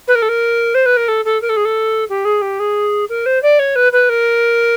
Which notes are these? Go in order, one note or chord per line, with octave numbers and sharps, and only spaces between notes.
B4
A#4
A4
A#4
C5
B4
A#4
A4
A4
A#4
A4
G#4
A4
G4
G#4
G4
G#4
A#4
C5
D5
C#5
B4
B4
A#4